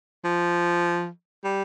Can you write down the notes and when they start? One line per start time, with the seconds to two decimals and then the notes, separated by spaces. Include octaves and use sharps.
0.25 F3
1.44 G3